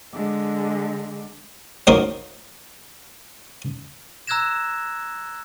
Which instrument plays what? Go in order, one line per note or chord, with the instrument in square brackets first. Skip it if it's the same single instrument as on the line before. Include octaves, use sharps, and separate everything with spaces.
[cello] D3 G#3
[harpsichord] F#3 A#3 D#4 A#4 C5
[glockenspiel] A#5 E6 F#6 G#6 A#6 E7